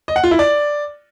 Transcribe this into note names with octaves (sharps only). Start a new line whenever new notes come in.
D#5
F#5
F4
E4
D5